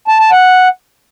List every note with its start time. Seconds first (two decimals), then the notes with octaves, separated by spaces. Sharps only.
0.08 A5
0.20 A5
0.31 F#5